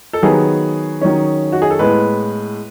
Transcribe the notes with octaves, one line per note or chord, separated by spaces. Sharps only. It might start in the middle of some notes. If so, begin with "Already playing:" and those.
A4
D#3 F#3 B3 G#4
D#3 F#3 C#4
F#4
G#4
A4
A2 G#3 B3 B4